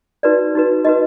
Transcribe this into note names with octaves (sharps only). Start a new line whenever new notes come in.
D#4 F#4 B4 D5
D#4 F#4 B4
D#4 F#4 B4 D#5